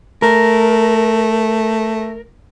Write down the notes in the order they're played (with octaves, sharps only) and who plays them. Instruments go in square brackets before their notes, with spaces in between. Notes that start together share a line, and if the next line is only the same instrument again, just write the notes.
[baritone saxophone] A3 [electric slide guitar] A#4